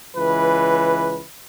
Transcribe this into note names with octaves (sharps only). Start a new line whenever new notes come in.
C#2 E3 B4